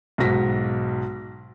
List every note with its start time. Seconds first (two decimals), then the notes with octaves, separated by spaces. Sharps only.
0.18 B1 G#2 F#4 A#6 B6